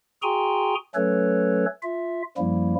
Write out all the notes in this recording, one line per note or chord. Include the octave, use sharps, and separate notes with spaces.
F#4 G#4 G5 G#5 A#5 C6
F#3 A3 C#4 A4 B4 C#5
F4 E5
F#2 F3 G3 A#3 E4